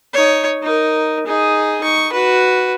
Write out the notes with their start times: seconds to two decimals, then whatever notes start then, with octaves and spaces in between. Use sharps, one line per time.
0.13 D#4 C#5
0.63 D#4 A#4
1.26 D#4 G#4
1.81 D#4 C#6
2.12 F#4 B4